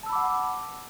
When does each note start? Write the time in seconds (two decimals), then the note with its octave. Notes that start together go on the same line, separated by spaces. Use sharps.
0.03 A5
0.06 E6
0.09 B5
0.12 D6
0.15 F#5